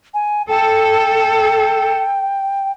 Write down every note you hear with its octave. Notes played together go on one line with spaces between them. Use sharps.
G#5
A4 G5